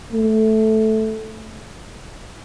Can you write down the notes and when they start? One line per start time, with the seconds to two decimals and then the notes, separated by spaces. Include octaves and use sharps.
0.13 A3